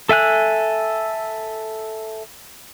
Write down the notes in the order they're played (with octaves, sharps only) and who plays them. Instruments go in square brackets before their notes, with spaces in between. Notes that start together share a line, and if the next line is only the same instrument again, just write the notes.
[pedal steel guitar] A4 E5 G#5 F#6